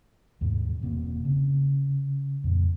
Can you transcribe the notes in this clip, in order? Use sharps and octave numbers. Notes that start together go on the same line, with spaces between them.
D#2 G#2 B2 G#3
E1 B2 A#3 C4
C#3
F2 A#2